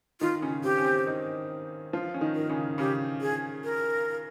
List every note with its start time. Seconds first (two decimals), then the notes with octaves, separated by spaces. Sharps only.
0.21 D#3 D#4 F4
0.42 C#3 C#4
0.64 C4 G4
0.78 C#4
0.85 C4
1.06 D#3 D#4
1.93 F3 F4
2.14 C#4
2.21 D#3 D#4
2.35 A#4
2.49 C#3 C#4
2.78 C#3 C#4 G4
3.21 G#4
3.64 A#4